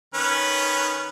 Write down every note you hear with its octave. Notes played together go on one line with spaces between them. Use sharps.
D#3 C#4 B4